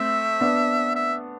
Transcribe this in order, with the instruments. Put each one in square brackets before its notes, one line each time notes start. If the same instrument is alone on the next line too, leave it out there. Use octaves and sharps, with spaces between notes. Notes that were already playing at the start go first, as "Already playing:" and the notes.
Already playing: [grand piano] A3 C4 [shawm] E5
[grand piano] B3 D4
[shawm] E5